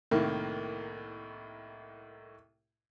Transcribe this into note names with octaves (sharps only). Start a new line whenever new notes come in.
C2 A2 D#3 A#3